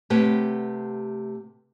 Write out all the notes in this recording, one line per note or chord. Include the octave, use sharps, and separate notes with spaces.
C3 A3 G4 B4 C#5 F#5